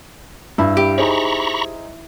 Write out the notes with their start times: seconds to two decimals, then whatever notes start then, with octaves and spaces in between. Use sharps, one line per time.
0.58 G2 E4
0.77 G4
0.98 D#4 G#4 C5 A#5 B5 C#6